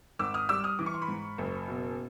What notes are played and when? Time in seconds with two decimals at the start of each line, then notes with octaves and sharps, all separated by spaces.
0.19 G#1 D6 E6
0.34 D#6 F6
0.49 G3 D6 E6
0.64 D#6 F6
0.79 E3 D6
0.86 C#6
0.94 C6
1.02 B5 C#6
1.08 G#2
1.38 F#1
1.68 B2